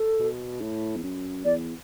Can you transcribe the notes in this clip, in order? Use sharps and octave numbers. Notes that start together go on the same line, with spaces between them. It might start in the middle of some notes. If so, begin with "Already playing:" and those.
Already playing: A4
B2
A2
E2
F#2
E2 D5